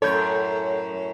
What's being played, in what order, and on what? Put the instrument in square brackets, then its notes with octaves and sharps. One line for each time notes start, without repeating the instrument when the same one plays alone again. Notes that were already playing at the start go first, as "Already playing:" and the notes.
[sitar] F#2 A2 C#5 [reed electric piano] A4 G6